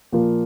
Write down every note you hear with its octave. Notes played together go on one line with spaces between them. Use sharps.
A#2 F3 A#3 F4